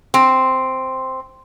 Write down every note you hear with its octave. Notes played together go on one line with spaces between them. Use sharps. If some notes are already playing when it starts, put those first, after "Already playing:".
C4